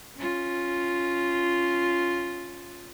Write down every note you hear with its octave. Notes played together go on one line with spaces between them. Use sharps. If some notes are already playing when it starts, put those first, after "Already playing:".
C#4 F4